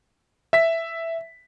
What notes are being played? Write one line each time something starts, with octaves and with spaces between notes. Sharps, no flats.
E5 B6